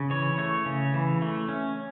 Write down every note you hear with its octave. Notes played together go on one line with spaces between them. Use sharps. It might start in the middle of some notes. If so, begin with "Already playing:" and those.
Already playing: C#3
E3 C#5
A3 C#5
C#3
E3
A3
C#4